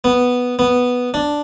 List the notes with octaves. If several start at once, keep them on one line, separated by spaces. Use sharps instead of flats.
B3
B3
D4